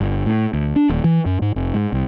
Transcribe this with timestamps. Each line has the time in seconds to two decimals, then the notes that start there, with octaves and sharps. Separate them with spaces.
0.01 G1
0.26 A2
0.53 D2
0.76 D4
0.89 D#1
1.04 E3
1.26 F#2
1.42 G#2
1.56 F1
1.74 G#2
1.93 C2